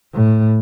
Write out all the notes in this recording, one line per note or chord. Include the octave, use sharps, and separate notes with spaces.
A2